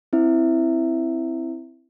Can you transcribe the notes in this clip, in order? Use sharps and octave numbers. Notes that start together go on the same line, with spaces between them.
C4 E4 E5